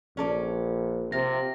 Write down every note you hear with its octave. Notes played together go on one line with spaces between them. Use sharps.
A#1 C#4 A4 D5
C3 F4 A#6